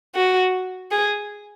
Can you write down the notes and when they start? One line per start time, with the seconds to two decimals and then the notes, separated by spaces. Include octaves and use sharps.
0.15 F#4
0.91 G#4